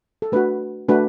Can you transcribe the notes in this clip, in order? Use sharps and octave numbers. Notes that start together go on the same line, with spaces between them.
A4
A3 D4 F#4 B4
A3 D4 F#4 B4